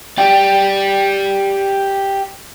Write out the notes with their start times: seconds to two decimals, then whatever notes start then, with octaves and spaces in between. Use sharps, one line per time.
0.18 G4 D5 G5